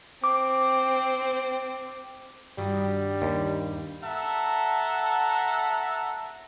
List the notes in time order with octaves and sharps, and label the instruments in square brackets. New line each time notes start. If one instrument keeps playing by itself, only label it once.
[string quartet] C4 [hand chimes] D6
[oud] G2 D#3 F#4 [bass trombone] G3
[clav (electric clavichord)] D#2
[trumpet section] A4 E5 F#5 A5 A#5